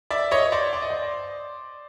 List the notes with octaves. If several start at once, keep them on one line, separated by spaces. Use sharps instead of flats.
D5 E5
C#5 D#5
C5 D5
D5
D#5
C5 D5